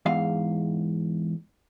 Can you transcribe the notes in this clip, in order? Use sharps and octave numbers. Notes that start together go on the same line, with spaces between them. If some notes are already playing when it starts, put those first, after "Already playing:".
E2 G#2 F5